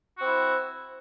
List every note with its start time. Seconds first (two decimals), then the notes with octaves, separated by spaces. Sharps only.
0.18 F#4
0.21 C4
0.24 E4